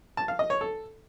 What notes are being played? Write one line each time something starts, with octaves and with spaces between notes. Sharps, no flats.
A5
F5
D#5
C#5
A4